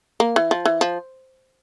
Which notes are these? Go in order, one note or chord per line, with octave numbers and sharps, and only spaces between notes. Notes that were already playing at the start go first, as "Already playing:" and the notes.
A#3
E3
F3
E3
F3